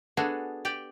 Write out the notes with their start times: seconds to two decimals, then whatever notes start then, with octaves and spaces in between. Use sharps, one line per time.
0.17 B3 D4 F#4 G#4 A4
0.65 G4 D5 G5